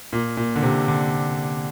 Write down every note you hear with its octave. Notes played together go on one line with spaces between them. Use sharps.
A#2
A#2
D3
C3
D3